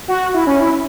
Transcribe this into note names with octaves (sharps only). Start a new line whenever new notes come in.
F#4
E4
C#4
E4